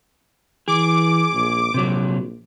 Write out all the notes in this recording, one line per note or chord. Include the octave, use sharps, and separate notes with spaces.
E3 G#4 D6
A#1
A#1 C3 F#3